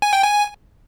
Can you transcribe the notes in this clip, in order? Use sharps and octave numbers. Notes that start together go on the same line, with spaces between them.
G#5
G5
G#5